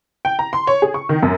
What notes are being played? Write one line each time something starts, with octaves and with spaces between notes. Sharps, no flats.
G5
A#5
C6
C#5
G#4
C#6
D#3
F#2